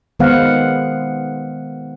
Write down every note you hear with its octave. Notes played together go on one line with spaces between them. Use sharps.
D#3 G#3 B3 C5 F5 F#5